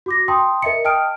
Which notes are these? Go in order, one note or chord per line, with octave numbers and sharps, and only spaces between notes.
F#4 D6 A#6
G5 A5 C6 D#6
A#4 D#5 E5 C#7
D#5 G5 A5 D#6 F6 D7